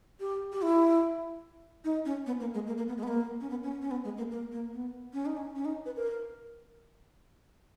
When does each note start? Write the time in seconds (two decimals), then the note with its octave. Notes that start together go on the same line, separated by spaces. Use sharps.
0.20 G4
0.53 G4
0.62 E4
1.84 D#4
2.06 C#4
2.26 B3
2.40 A#3
2.54 G#3
2.67 A#3
2.77 A#3
2.88 B3
2.97 G#3
3.03 B3
3.08 A#3
3.41 C#4
3.50 B3
3.63 C#4
3.82 C#4
3.91 B3
4.04 G#3
4.18 A#3
4.31 A#3
4.52 A#3
4.73 B3
5.13 C#4
5.26 D#4
5.37 C#4
5.56 C#4
5.65 D#4
5.86 B4
5.97 A#4